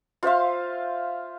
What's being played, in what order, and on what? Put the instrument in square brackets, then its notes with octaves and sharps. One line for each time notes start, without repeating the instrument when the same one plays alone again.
[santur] F4 C5 E5 F5